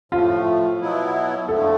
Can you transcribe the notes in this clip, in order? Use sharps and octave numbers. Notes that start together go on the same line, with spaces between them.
A2 F3 A3 F4
B2 F#3 B3 E4
F2 D3 F3 A3 A4